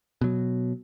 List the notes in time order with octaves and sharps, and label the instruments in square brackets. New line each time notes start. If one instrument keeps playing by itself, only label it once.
[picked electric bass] B2 F#3